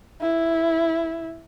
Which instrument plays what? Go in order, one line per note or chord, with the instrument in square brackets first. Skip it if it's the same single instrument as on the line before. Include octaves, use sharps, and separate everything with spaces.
[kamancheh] E4